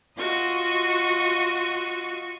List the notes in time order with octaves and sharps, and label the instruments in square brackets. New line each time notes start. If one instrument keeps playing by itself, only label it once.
[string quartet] F4 F#4 D#5 C#6